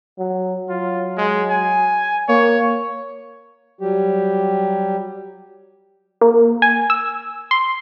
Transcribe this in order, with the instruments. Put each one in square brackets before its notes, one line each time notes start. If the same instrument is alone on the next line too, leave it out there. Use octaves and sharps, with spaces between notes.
[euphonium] F#3
[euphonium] F#3 [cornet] F4
[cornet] G#3
G#5
[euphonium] A#3 [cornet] C#5
[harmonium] F#3 G3 G4
[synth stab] A#3
G#5
E6
C6